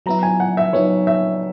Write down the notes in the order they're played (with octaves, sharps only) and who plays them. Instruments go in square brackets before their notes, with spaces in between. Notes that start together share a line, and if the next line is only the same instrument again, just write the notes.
[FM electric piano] F#3 B3 E4 [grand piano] A#5
[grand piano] G#5
F#5
E5
[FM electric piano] F#3 B3 D#4 [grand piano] C#5
[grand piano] E5